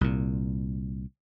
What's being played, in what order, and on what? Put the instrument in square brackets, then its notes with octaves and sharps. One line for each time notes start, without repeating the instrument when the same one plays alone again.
[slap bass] C2 A#2